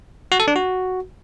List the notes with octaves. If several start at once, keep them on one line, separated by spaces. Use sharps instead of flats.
F#4
A4
D4
F#4